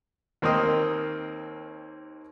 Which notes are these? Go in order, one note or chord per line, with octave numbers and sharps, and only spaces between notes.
D#2 A#3 C4 D#4 A#4 D#5